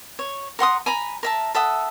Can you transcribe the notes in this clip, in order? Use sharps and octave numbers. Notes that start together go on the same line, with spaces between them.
C#5
A#4 F#5 C6 D#6
G#5 A#5 B5
A#4 E5 A5
A4 E5 F#5 D#6